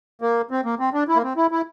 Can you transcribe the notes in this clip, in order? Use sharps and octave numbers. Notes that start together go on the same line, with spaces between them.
A#3
C4
A#3
C4
D4
E4
A#3
C4
E4
E4